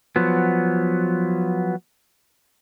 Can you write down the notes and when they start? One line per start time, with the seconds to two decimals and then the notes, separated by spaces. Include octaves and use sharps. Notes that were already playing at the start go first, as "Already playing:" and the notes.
0.16 F3 F#3 B3